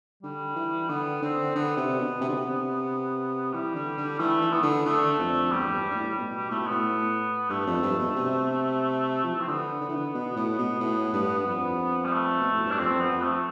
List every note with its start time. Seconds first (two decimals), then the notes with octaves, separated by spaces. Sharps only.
0.23 D3 G3
0.56 E3
0.89 D3 B3
1.22 D3 C4
1.56 D3 B3
1.77 C3
1.99 B2
2.21 C3
2.29 D3
2.37 C3
3.53 E3 G3
3.76 D3
3.98 D3
4.19 E3 A3
4.42 E3
4.53 E3 B3
4.63 D3
4.86 D3 A3
5.19 F2
5.52 E2 G3
5.68 A2
5.74 G2
5.91 G2
5.95 A2
6.18 B2
6.34 G3
6.50 A2 A3
6.61 B2
6.67 A2 B3
7.50 G2 A3
7.67 F2
7.83 G2
7.99 B2
8.16 C3
9.24 F3
9.36 E3 C4
9.48 D3 B3
9.81 D3
9.89 E3
9.97 D3
10.14 B2
10.36 A2
10.59 B2
10.80 A2
11.13 G2
11.46 F2 B3
12.05 G3
12.13 A3
12.41 B2
12.54 A2
12.66 G2 D4
12.79 F2 C4
12.95 F2
13.00 B3
13.12 F2
13.22 A3